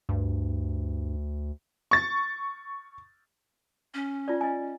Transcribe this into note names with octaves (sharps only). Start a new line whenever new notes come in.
D2 G2
C#6 A6
C#4
F4 D5
D#5 G#5